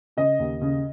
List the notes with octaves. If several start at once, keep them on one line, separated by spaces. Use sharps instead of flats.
C#3 D#5
D#2
C#3